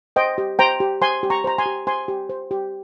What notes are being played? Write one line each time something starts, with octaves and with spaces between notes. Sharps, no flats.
C5 D#5 G5
G4
C5 G5 A#5
G4
C5 G#5 C6
G4
A#5 C#6
C5 A#5
G#5 C6
G4
C5 G#5 C6
G4
C5
G4